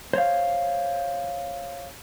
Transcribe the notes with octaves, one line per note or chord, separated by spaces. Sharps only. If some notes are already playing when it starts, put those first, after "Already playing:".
C5 C#5 F5